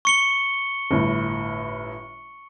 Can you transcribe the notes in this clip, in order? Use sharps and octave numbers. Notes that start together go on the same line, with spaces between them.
C#6 C#7 G7
G1 A2